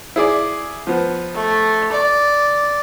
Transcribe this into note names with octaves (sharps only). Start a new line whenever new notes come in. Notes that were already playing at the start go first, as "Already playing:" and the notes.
E4 G#4 D5
F3 B3
A3
D5